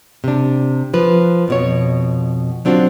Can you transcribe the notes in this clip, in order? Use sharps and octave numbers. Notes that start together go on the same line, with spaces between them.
C3 D4
F3 B4
F2 B2 C#5
F#3 C4 D4 F4 F#4